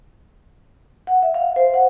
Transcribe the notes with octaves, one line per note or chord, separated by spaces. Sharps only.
F#5
E5
F5
C5
F#5